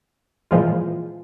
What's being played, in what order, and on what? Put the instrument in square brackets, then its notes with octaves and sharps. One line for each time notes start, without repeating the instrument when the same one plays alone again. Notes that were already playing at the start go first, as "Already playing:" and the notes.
[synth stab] A#2 E3 F3 G#3 F4